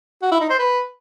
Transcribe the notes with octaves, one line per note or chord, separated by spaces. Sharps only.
F#4
E4
D#4
C5
B4